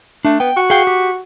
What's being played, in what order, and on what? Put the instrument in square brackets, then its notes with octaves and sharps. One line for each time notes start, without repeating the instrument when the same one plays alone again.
[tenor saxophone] A3 [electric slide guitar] D4
[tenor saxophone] B3 [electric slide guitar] G5
[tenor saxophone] F#4
[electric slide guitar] G#4 F5 G5
G4